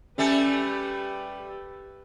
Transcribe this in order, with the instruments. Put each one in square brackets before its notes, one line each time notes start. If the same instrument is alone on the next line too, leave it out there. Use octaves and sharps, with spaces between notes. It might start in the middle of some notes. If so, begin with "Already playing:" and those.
[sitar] G3 A3 A4 [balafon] C#4 E5 G#5 [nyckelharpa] G4 B4